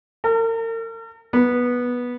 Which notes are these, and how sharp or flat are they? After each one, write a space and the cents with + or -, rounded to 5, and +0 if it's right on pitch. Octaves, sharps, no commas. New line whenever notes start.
A#4 -40
B3 -10